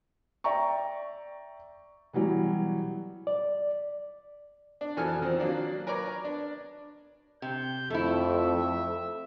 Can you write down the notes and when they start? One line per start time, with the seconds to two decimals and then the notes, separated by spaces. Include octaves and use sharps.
0.44 D5 E5 G5 A#5 C#6
2.13 B2 E3 F#3 G3
3.27 D5
4.81 D4
4.97 F2 B2 E3 A4 G#5 F6
5.22 D#3 F3 C4
5.40 F#3 A#3 D4
5.87 A#4 B4 C#5 D5 A#5
6.24 D4
7.42 C3 G6
7.90 F2 A3 E4 E5